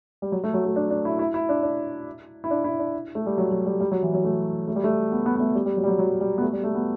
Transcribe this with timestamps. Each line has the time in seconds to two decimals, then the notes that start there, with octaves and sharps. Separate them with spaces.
0.22 G3
0.32 F#3
0.44 A3
0.54 F#3
0.65 A3
0.76 D4
0.90 D4
1.05 E4
1.19 E4
1.34 E4
1.49 D4
1.63 D4
2.44 E4
2.50 D4
2.64 E4
2.79 D4
3.15 A3
3.26 G3
3.38 F#3
3.52 F#3
3.66 G3
3.81 G3
3.92 F#3
4.03 E3
4.14 F#3
4.24 A3
4.68 A3
4.76 G3
4.84 A3
5.11 B3
5.26 B3
5.36 B3
5.40 A3
5.55 G3
5.66 G3
5.77 F#3
5.83 G3
5.88 F#3
5.99 F#3
6.21 G3
6.38 B3
6.42 A3
6.53 G3
6.64 A3
6.75 B3